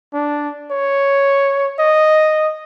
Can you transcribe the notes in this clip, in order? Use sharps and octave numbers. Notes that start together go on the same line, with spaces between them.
D4
C#5
D#5